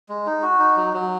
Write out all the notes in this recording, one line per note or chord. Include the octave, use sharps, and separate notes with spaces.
G#3
D#4
F#4
D#4
F#3
F#3